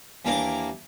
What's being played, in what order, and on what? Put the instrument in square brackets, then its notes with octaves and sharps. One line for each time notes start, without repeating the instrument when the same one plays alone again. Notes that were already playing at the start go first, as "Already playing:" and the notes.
[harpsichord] D#2 E3 A#3 D4 A#4 D6